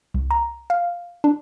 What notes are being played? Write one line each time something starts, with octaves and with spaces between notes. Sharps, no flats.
C2
A#5
F5
D4